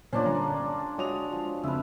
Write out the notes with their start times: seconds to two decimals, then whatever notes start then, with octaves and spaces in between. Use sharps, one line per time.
0.13 A#2 C#4 D4 F4 C5
0.26 G1 A#5
0.98 G#3 F#4 C#5 D#6 F7
1.33 F3
1.63 F2 C#3 B4 E5